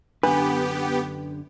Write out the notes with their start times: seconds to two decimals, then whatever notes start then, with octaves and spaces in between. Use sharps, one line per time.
0.23 F#2 D3 B3 D4 G4 B4